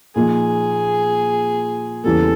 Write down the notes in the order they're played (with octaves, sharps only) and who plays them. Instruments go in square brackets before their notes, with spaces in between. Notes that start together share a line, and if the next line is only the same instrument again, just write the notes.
[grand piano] A#2 F3 A#3 D#4 [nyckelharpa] G#4
[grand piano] E2 C#3 E3 G3 A#3 [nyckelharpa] A4